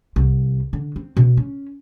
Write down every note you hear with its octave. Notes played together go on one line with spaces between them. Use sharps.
C2
D3
C4
B2
C#4